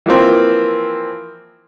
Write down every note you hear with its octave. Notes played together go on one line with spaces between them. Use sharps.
E3 F3 A#3 C4